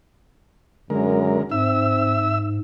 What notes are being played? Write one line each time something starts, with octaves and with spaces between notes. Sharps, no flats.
F#2 D3 G#3 A#4
G#2 C4 E5 E6